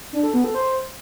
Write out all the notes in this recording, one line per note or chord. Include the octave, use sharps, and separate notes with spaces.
D4
A4
B3
A4
C5